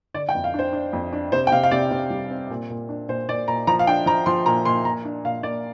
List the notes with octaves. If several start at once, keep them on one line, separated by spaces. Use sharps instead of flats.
D3 D5
G5
F2
F5
D4 C5
D4
F2
D4
C3 C5
G5
C3 F5
F5
C3 D5
C3
G3
C4
A#2
A#2
D4
A#2 C5
A#2 D5
A#2 A#5
F3 A#5
F5
D4 G5
F3 A#5
F3 C6
A#2 A#5
A#2 C6
A#2 A#5
D4
A#2 F5
A#3 D5